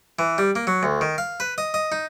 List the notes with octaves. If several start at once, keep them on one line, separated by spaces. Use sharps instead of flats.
E3
G3
A#3
F#3
D2
D#3
F5
B4
D#5
D#5
D#4